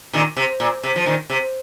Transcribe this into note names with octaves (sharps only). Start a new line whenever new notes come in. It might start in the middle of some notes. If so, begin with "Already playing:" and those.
A#2 D#3
C3
A#2
C3
F3
A#2 D#3
C3